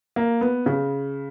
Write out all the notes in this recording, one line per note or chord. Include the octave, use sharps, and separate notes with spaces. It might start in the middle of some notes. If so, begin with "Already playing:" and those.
A#3
B3
C#3